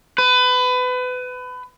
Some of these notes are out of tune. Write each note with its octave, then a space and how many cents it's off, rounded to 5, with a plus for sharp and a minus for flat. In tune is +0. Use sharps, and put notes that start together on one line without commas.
B4 +25